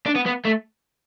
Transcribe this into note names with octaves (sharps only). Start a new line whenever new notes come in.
D4
B3
B3
A3